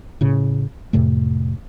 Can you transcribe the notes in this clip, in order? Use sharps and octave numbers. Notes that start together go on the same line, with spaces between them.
A2 C#3
F2 A2 C3 A3